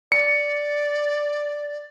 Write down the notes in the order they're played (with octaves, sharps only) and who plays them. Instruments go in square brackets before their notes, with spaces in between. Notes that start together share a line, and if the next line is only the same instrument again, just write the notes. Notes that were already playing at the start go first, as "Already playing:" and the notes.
[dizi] D5 [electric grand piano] C#7